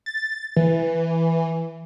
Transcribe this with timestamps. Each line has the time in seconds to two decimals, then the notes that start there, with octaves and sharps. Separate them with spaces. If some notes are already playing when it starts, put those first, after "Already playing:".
0.06 A6
0.57 E3